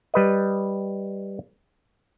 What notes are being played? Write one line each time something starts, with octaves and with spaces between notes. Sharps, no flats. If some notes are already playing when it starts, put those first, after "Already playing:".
G3 B4 D#5